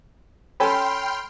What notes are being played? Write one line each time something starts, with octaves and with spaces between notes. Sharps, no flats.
C#4 A4 G5 G#5 B5 C6 F6